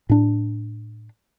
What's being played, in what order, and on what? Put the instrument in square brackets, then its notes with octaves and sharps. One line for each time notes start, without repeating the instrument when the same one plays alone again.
[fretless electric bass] A2 D4